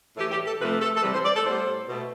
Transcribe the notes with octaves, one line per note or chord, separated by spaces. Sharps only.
A2 E3 A3 G4
G4
A4
C3 F3 A3 B4
A4
A4
C3 E3 G3 B4
C5
D5
A4
A2 G3 B3 C5
B2 A3